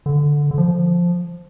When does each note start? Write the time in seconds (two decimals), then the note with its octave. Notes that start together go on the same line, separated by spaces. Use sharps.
0.06 D3
0.51 D3
0.58 F3